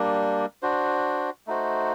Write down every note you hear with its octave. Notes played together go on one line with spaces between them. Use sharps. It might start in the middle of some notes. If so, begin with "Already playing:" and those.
Already playing: G3 A#3 D4
D4 F#4 C5
A3 D#4 F#4 C5